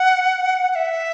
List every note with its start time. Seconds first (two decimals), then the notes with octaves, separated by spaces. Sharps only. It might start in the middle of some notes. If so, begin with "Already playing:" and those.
Already playing: F#5
0.72 F#5
0.75 E5